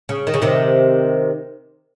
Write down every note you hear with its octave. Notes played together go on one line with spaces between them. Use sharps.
C#3
D#3
C#3
C3 D#3